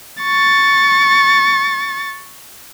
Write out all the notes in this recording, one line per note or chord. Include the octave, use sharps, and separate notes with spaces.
C#6 A6